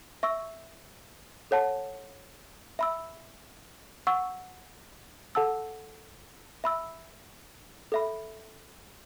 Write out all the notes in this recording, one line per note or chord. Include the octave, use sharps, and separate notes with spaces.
E5 C#6 E6
A4 C#5 F#5 A5
E5 B5 E6
F#5 C#6 E6
A4 F#5 A5 E6
E5 B5 E6
A4 E5 B5